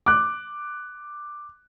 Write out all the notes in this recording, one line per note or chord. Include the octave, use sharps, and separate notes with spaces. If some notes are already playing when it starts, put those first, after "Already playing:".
D6 F#6